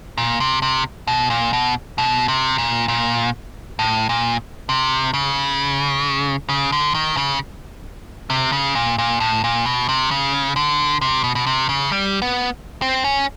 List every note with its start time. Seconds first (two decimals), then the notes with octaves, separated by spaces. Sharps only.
0.18 A#2
0.40 C3
0.62 C3
1.07 B2
1.30 A#2
1.53 B2
1.98 B2
2.28 C3
2.58 A#2
2.88 A#2
3.79 A2
4.09 A#2
4.69 C3
5.14 C#3
6.49 C#3
6.72 D3
6.94 D#3
7.17 C#3
8.30 C3
8.52 C#3
8.75 A#2
8.98 A#2
9.20 A2
9.44 A#2
9.66 B2
9.89 C3
10.11 C#3
10.56 D3
11.01 C3
11.24 B2
11.35 B2
11.47 C3
11.69 C#3
11.92 G3
12.22 B3
12.82 C4
13.04 C#4